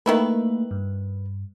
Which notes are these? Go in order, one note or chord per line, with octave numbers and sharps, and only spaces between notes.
D#3 A3 A#3 E4 B4
G2